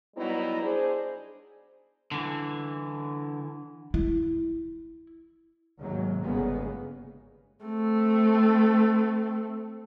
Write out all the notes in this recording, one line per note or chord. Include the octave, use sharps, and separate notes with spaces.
F#3 G3 B3 D#4 E4
D4 G#4 C5
D3 E3
E4
D#2 G#2 C3 F#3
G1 C#3 G#3 A#3 B3
A3 C4